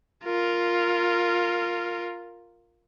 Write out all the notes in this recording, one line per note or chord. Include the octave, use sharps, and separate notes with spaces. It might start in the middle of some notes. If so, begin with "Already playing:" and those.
F4 A#4